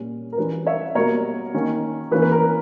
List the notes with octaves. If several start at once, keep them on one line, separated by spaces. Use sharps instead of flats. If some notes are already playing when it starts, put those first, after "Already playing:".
Already playing: A#2 G3 C#4
A#4
E3 G3 C#4 B4
C#5 E5
B2 G3 A#3 A#4 C#5
D#3 A#3 C#4
E3 A#3 C#4 B4
B4
A#4